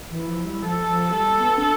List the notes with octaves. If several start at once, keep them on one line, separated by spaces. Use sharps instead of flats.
E3 E4
F3
G3
F3 A4
F3
G3 A4
B3
D4